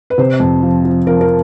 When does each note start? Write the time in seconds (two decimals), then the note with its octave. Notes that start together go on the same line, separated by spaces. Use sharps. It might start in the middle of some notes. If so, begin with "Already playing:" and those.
0.10 B4
0.18 C3 C5
0.40 F2
0.62 F3
0.85 F3
1.07 F3 A#4
1.21 A#4